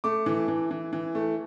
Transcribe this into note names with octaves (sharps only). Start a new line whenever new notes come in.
A3 D6
E3
E3
E3
E3
A3